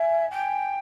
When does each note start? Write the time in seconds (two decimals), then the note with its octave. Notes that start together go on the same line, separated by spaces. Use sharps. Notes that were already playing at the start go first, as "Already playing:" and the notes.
Already playing: E5 G#5
0.31 G5